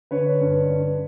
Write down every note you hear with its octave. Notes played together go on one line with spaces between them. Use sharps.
D3 B4 C#5
G2
G2